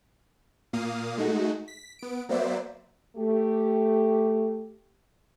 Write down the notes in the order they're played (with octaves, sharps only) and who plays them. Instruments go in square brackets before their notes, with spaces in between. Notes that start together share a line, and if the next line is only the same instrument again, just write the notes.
[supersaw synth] A#2 A#3 F5 D#6
G#3 A3 D#4 F#4
B6
B3 D7
F#3 A#3 B3 C5 D5 E5
[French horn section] A3 G4